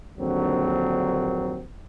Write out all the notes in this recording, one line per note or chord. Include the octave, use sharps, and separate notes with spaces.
A#1 D#2 D3 F#3 C4